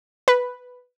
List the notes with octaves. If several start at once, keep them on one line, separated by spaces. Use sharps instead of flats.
B4